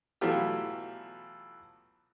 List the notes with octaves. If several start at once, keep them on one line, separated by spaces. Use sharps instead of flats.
B2 E3 F#3 A3 F4 G4